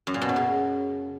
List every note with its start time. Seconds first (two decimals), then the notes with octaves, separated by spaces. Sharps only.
0.07 F#2
0.14 A#2
0.22 B2
0.29 F#3
0.36 C#3